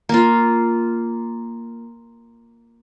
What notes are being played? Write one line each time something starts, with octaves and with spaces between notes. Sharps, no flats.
A#3 F4